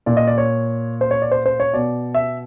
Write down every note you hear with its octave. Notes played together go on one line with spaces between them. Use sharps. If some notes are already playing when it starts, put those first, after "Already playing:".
A#2 D5
D#5
D5
C#5
C5
C#5
D5
C5
C5
C#5
B2 D5
E5